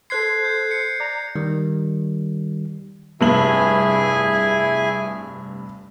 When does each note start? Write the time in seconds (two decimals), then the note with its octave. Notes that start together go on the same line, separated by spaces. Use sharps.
0.10 A4 C5 C6 F#6 G#6 C7
0.45 G6
0.71 C7 C#7
1.00 D5 A#5
1.36 D#3 G3
3.21 F1 G2 E4 G#4 G#5 F#7